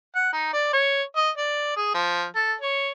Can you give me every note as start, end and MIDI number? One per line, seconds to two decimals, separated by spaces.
0.15 0.31 78
0.33 0.51 63
0.53 0.69 74
0.73 1.02 73
1.16 1.30 75
1.37 1.73 74
1.76 1.91 68
1.94 2.25 53
2.35 2.55 69
2.61 2.92 73